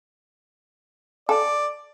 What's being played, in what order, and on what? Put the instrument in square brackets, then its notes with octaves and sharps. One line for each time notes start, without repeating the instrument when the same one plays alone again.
[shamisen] A4 [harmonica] D5